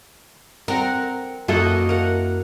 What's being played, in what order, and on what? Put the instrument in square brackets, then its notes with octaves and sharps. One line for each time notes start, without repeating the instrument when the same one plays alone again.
[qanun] C4 F#5 [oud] A#4
[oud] F#2 A#3 E4 [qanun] F#4 A4 D#5
[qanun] A#4 F#5